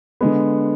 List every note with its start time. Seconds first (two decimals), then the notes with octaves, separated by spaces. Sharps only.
0.21 D3 G#3 B3